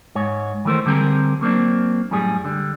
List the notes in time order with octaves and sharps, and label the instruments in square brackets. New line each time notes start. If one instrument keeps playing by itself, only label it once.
[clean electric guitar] G#2 C#5
D#3 E3 A3 A#4 C5
D3 G3 C4 G#4 A#4
F#3 A#3 C4 D4
F#2 A2 G3 G#4
D3 G3